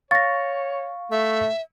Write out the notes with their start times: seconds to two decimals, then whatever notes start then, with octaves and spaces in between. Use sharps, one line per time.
0.11 C#5 F5 C#6 A6 A#6
1.12 A3 E5